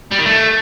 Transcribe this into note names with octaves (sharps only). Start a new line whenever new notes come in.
G3
D#3
A3